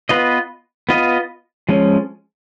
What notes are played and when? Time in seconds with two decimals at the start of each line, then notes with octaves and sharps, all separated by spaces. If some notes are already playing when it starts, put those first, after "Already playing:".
0.09 B3 F4 B4 D#5
0.89 B3 F4 B4 D#5
1.69 F3 G#3 C#4